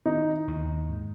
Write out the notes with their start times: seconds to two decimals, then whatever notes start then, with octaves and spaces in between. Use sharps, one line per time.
0.06 D#3 D#4
0.48 D#2
0.89 G#2